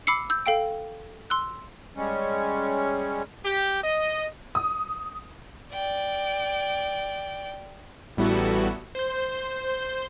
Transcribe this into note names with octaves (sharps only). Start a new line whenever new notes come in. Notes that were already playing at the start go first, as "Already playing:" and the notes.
B5 D6 E6 C7 C#7
E6 G6
A4 F5 G5 D7
C6 E6 F#6
G3 G#3 C#4
G4
D#5
D#6
D5 G5
A1 G3 B3 E4 F#4 A4
C5 G6